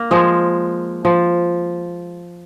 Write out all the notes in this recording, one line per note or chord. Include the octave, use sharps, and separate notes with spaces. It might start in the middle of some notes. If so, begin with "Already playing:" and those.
Already playing: A#3
F3 G#3
F3